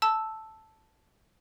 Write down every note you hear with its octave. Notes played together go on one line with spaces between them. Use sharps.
A5 E6